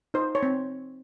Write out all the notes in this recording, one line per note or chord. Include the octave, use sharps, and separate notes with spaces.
D#4 C5
C#5
C4